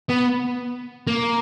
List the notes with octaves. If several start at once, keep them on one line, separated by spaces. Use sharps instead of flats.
B3
A#3